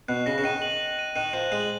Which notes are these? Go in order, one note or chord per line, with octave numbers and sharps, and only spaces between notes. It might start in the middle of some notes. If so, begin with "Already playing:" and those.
B2 F#6
C#3 A#6
C#3
D#3 D#7
F#7
F#7
D#7
D#3 F#6
F3 D#7
G#3 F#7